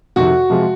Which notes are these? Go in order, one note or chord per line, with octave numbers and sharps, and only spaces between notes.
F2 C3 D#3 F#4
C3 F3 G#3